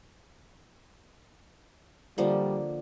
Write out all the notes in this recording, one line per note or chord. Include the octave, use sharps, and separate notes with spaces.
D3 F3 G3 A#3